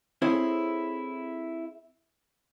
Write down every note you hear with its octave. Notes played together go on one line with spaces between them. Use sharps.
C4 E4 G#4 A4 C#5